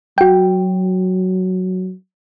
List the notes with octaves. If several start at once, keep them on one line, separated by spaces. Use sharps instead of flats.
F#3 F#4 G5